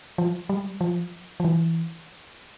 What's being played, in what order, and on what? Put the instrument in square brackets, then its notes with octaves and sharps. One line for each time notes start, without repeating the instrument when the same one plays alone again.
[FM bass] F3
G3
F3
F3
E3